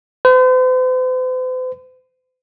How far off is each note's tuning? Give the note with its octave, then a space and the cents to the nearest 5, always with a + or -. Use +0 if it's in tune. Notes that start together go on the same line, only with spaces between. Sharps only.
C5 -45